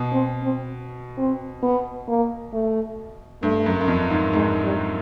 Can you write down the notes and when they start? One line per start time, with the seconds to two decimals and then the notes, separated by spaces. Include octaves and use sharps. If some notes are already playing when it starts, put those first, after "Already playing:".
Already playing: B2
0.12 C4
0.43 C4
1.17 C4
1.63 B3
2.08 A#3
2.53 A3
3.43 G2 A3
3.66 F#2
3.81 F#2
3.88 F2
4.10 G#2
4.33 G#2 G#3
4.64 G3